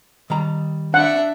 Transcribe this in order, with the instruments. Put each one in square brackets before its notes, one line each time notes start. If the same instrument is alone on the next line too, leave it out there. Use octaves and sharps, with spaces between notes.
[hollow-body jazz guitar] D#3 G3 A#5
[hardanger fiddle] D4 E5 [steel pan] F#5